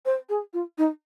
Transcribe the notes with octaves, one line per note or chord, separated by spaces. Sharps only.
C5
G#4
F4
D#4